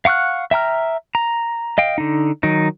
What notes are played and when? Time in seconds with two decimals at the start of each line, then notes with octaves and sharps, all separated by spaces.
0.05 F5 F#5 C#6 F6 F#6
0.51 E5 G5 A#5 F6
1.15 A#5
1.78 D#5 F5 G5
1.98 D3 D#4
2.43 D#3 F#3 D#4